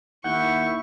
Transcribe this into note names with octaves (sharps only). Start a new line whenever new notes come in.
D#2 E4 F#5 C#6 F#6 G6